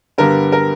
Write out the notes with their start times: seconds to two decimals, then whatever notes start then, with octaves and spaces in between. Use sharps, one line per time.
0.18 G2 D3 G3 B3 A#4
0.52 A#4